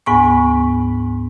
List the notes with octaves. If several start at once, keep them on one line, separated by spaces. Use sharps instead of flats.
D2 G#2 B3 G#5 C#6